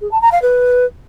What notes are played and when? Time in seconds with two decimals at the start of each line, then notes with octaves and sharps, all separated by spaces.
0.01 G#4
0.11 A5
0.22 A#5
0.32 F5
0.42 B4